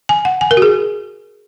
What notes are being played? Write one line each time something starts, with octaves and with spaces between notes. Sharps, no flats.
G#5
F#5
G#5
A#4
F#4
G#4